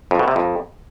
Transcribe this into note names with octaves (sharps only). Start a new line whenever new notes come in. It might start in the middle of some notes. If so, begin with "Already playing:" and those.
F2
B2
C3
F2